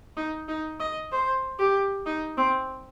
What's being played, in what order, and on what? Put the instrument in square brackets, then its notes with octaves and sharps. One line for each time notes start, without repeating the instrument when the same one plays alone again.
[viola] D#4
D#4
D#5
C5
G4
D#4
C4